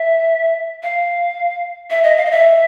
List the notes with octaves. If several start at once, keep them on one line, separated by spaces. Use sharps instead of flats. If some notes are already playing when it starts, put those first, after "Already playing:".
Already playing: E5
F5
E5
D#5
F5
D#5
E5